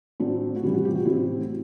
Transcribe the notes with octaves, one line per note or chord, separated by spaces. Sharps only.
A2 F#3 C4 D4
F#4
C3 E3 G3 E4
F#4
G4
F#4
A2 F#3 C4 E4